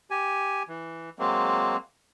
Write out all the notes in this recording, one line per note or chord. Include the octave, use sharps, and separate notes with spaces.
G4 G#5
E3
F#3 G#3 A#3 C4